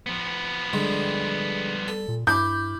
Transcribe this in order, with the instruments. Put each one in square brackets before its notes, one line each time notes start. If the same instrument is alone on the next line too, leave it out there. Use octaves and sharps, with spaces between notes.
[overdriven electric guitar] F3 B3
[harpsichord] D3 G#3 [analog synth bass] G3
[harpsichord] A4
[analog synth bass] A#2
[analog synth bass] G2 [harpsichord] E4 B5 D6 [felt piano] G6